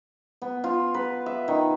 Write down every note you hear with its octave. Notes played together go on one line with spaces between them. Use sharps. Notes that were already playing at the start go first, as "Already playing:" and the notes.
B3
F4
B4
E5
D#3